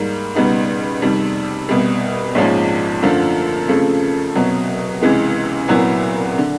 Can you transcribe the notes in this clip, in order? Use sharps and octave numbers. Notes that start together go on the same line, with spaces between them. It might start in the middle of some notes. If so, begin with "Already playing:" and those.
Already playing: G#2 D#3 G3 A#3
C#2 B2 G3 B3 D#4
F2 C3 D#3 G3
C2 B2 G3
A#1 G#2 F3 G#3 C#4
F#2 D3 F3 A3
F2 C#3 F3 A3
C2 B2 F#3
C#2 C3 E3 G#3
C2 A#2 F#3 B3 E4
D3